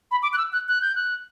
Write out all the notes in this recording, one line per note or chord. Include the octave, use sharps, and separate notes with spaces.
B5
D6
F#6
E6
F#6
F#6
G6
F#6